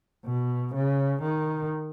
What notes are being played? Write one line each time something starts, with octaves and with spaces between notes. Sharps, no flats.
B2
C#3
D#3